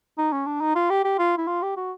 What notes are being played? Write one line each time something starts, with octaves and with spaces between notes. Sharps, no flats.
D#4
C#4
D4
D#4
F4
G4
G4
F4
E4
F4
G4
F#4